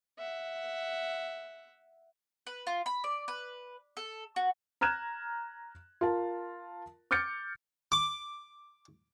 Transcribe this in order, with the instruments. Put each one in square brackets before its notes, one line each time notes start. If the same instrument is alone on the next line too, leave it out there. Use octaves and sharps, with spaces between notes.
[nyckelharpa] E5 F#5
[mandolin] B4
F4
B5
D5
B4
A4
F#4
[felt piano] A#5 F6 F#6 G#6 E7
F4 A#4 A5
D6 F6 G6 A6 C#7
[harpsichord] D6